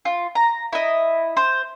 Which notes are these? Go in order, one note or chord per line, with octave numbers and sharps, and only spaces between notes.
F4
A#5
E4 D#5
C5